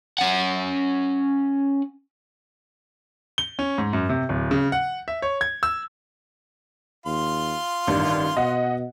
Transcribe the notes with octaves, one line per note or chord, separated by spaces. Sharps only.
C#4 F#5
G7
C#4
G#2
F#2
C3
D1
C#3
F#5
E5
C#5
G#6
E6
D#2 F4 C6
A1 G2 D#3
B2 D#5 F#5